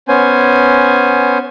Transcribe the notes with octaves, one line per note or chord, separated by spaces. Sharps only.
B3 C#4 C5 G#5